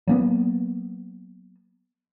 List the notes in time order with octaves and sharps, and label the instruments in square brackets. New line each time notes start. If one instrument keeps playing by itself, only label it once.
[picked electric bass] F#3 A#3 B3